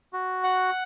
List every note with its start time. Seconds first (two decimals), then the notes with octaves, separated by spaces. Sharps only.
0.13 F#4
0.44 F#5